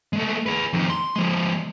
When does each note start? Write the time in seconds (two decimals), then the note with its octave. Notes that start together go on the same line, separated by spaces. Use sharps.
0.13 G#3 A3
0.46 G#4 B4
0.73 F2 D#3
0.90 C6
1.16 F3 G#3